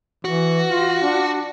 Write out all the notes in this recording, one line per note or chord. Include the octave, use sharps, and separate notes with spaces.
E3 F#4
F4
D4